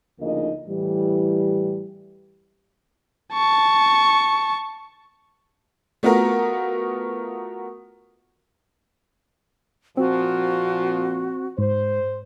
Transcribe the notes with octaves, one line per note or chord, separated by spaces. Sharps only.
D2 C#3 F3 A#3 D#4 D#5
A2 E3 G3
A5 C#6
A3 B3 F4 F#4 A#4
A#2 F3 C4 F#4
G#2 C5